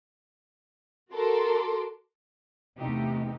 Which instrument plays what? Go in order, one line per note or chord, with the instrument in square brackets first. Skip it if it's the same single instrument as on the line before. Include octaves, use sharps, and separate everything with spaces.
[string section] F#4 A4 A#4 C6 D6
[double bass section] E2 C3 [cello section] A3 D#4 G4